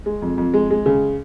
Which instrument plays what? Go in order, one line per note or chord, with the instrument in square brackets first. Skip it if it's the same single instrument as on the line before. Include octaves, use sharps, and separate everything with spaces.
[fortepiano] G#3
F2
F2
G#3
G#3
C#3